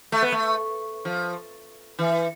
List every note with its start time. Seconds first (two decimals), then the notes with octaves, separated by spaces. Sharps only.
0.12 A3
0.22 B3
0.32 A3
1.05 F3
1.99 E3